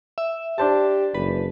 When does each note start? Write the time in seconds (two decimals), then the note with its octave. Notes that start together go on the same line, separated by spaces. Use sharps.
0.18 E5
0.58 D4 G4 C5 A5
1.14 F#1 E3 B4